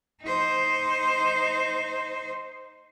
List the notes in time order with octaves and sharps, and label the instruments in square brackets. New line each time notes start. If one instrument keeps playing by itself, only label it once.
[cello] D#4 C5